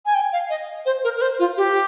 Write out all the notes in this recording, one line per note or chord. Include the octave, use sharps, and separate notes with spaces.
G#5
G5
F5
D#5
C5
A#4
A#4
C5
F4
G4